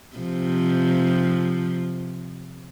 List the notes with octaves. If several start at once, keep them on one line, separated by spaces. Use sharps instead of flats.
C3 F3